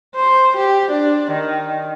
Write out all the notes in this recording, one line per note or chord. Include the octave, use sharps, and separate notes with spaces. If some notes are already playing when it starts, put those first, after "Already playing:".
C5
G4
D4
D#3